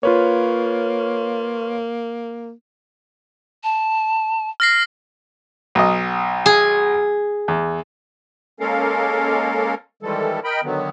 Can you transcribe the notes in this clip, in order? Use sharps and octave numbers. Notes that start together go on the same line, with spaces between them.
A#3 F4 B4 C#5
A5
F6 A#6 C7
B1 D#5
G#4
E2
G#3 A#3 C#4 A4 A#4 F5
D#3 E3 G3 G#3 A4
A#4 D#5 G5 B5
D3 D#3 F#3 B3